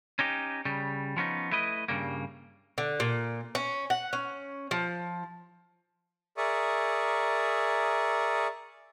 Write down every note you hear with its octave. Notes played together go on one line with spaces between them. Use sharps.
C#4 D#4 G4
C#3 G3
F3 B3 C#4 D#4
A3 E4 B4 D#5
G2 C#3 G3 A#3
D3
A#2
C#4
F#5
C#4
F3
G#4 A#4 D5 E5 C#6 D#6